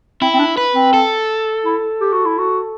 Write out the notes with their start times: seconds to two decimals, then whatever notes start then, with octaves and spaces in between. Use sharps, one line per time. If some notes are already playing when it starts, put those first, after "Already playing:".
0.21 C4 E4
0.34 C4
0.39 D4
0.57 B4
0.75 C4
0.94 A4
1.65 E4
2.01 G4
2.13 F#4
2.25 E4
2.38 F#4